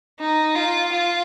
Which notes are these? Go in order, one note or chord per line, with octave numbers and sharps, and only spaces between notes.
D#4
F4
F4